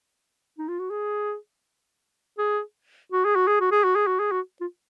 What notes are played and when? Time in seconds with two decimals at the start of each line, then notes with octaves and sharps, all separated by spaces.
0.58 D#4
0.69 F4
0.79 F#4
0.90 G#4
2.38 G#4
3.12 F#4
3.25 G#4
3.36 F#4
3.47 G#4
3.60 F#4
3.71 G#4
3.84 F#4
3.96 G#4
4.07 F#4
4.20 G#4
4.32 F#4
4.61 F4